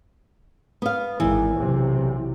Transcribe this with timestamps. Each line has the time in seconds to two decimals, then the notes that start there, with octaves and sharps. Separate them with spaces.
0.82 B3 F5
1.20 G#1 E3
1.56 B1 C3